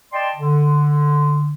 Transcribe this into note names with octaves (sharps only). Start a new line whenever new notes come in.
D5 D#5 G5 A5 C6
D3